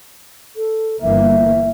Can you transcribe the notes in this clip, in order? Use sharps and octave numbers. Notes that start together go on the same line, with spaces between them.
A4
G1 E3 A#3 E5